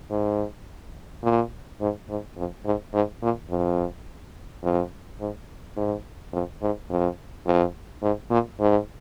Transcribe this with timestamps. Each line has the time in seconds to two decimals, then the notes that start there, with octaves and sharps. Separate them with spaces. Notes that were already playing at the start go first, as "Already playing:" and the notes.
0.10 G#2
1.23 A#2
1.81 G#2
2.09 G#2
2.37 F2
2.65 G#2
2.93 G#2
3.22 A#2
3.50 F2
4.63 F2
5.20 G#2
5.77 G#2
6.33 F2
6.62 G#2
6.90 F2
7.46 F2
8.02 G#2
8.31 A#2
8.60 G#2